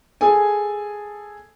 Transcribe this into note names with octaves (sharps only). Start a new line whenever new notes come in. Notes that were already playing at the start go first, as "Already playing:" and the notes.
G#4 A4 G#5